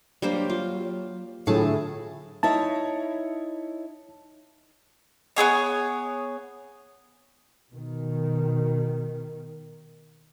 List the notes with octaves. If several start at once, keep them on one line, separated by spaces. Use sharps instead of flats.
F#3 G3 A#3 D4 C5
F4 G4
A2 D3 F#3 F4 G#4 A4 A5
D#4 E4 C#5 A5
B3 C4 G#4 C#5
B2 D#3